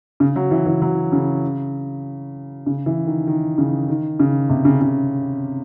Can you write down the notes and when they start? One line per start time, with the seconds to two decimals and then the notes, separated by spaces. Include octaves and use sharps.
0.20 C#3
0.36 F#3
0.51 E3
0.66 E3
0.82 F#3
1.12 C#3
2.66 C#3
2.86 E3
3.07 D#3
3.27 D#3
3.58 C#3
3.89 D#3
4.20 C#3
4.50 C3
4.65 C#3
4.81 C#3